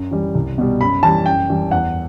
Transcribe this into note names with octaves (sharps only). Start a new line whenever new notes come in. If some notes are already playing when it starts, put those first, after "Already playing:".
Already playing: F#2
E3 G3
C2
B2 G3
F#2 B5
E3 G3 A5
F#2 G5
E3 G3
E2 F#5